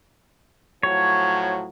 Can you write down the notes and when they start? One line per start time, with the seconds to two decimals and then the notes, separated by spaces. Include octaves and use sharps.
0.83 A2 F3 F#3 C#5